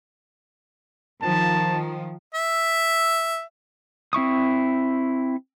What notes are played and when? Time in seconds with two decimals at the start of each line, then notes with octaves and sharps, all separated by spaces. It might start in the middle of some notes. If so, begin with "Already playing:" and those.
1.22 D#3 F3 A5
2.35 E5
4.13 C4 E4 C#6 D#6